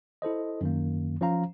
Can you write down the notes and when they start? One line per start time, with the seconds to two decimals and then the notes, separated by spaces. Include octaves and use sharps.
0.22 E4 A4 C5 D#5
0.61 F#2 D#3 A#3
1.21 F3 C#4 C5 F5 A#5